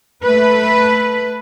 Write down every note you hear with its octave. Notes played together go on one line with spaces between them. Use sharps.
A3 B4